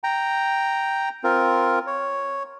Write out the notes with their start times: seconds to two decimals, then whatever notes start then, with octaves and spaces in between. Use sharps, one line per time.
0.03 G5 A#5
1.24 C4 F4 A#4
1.87 C#5